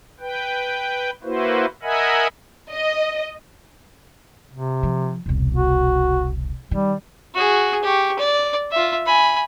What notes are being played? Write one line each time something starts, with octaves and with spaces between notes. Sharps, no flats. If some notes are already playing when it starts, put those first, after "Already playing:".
B4 G5
A#3 E4 F#4 B4 C5
A#4 D#5 E5 F#5 G#5 B5
D#5
C3
F3
E1 C2
F#4
D#3 G3
F#4 G#4
G4 C#6
D5
F4 E5
G#5 B5